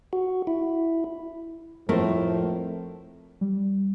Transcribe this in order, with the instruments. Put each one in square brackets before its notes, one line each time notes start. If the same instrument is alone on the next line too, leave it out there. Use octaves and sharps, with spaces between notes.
[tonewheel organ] F#4
E4
[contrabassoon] F2 [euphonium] A2 [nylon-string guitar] A3 [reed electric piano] A#4 C5
[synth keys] G3